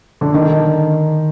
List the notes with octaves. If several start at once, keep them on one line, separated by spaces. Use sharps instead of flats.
D3
D#3